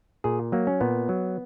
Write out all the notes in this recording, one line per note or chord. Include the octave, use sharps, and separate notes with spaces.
A#2 G#4
F#3 A#3
C#4
A#2 B3
F#3